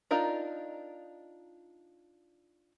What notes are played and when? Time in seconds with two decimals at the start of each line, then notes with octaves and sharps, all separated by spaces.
0.11 D4 D#4 F4 A#4 D#5